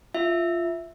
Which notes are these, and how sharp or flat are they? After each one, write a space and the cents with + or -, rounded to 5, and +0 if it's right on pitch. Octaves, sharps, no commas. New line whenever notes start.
F4 -10 E5 +0